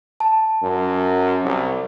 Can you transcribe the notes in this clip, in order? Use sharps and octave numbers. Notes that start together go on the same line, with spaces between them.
A5
F#2
C2